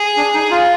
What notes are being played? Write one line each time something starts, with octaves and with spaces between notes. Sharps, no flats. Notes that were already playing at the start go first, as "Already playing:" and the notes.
Already playing: G#4
D4
D#4
F4